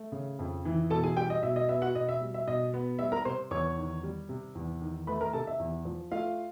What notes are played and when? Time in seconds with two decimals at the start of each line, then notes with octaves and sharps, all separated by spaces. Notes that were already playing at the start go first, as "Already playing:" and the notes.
Already playing: A3
0.12 C#3
0.39 F2
0.65 E3
0.90 B2 A4 A5
1.04 G#4 G#5
1.17 G3 G4 G5
1.30 D#5
1.43 B2 E5
1.56 D#5
1.69 B3 E5
1.82 F#4 F#5
1.95 B2 D#5
2.09 E5
2.21 G3
2.34 E5
2.47 B2 D#5
2.74 B3
2.99 G3 E5
3.12 A#4 A#5
3.25 C3 C5 C6
3.51 E2 C#5 C#6
3.77 D#3
4.03 G3
4.29 C3
4.55 E2
4.82 D#3
5.07 A3 B4 B5
5.21 A#4 A#5
5.33 C3 A4 A5
5.47 E5
5.60 E2
5.85 F3
6.12 A3 F4 F5